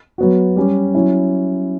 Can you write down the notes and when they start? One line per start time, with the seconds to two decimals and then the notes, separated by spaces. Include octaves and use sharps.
0.18 F#3 B3 F#4
0.56 G3 C#4 G4
0.95 F#3 C#4 E4